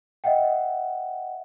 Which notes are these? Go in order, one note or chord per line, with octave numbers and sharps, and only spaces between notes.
D#5 E5 F#5 G5